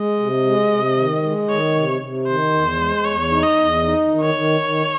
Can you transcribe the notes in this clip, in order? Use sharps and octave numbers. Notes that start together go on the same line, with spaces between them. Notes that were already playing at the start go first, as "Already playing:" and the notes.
Already playing: G#3 D#5
C3
G#3
C3
D#3
G#3
D#3 C#5
C3
C3
D#3 C5
E2
G#3
E2 C#5
D#4
D#5
E2
D#4
D#3
C#5
D#3
D#3